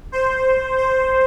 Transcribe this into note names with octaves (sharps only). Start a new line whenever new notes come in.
C5
C5